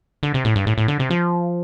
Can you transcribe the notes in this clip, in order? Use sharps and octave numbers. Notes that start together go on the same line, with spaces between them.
D3
C3
A2
G2
A2
A2
D3
C3
F3